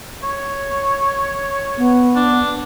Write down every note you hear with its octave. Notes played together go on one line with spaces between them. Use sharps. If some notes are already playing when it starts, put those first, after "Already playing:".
C#5
B3
D4